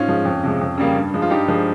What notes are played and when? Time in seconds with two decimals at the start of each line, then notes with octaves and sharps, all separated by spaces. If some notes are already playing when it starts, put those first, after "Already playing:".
Already playing: G#2 C#4 F4
0.08 F3 G#3
0.25 F2
0.44 C3 F3 G#3
0.61 F2
0.78 C#3 G3 A#3
0.96 G2
1.14 F3 G#3
1.22 F4
1.30 G2 D#4 G4
1.48 F3 G#3